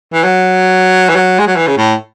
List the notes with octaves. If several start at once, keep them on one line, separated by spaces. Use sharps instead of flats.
E3
F#3
E3
F#3
G#3
F#3
E3
C#3
A2